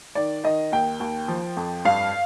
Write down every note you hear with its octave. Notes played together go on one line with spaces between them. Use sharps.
D#3 D5
D#3 D#5
D#2 G5
D#2
F3
F2
G2 F5